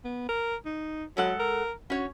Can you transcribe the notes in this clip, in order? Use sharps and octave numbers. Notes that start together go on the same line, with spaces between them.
B3
A#4
D#4
F#3 G#3 A4 F#5
A#4
C#4 F#4 C#5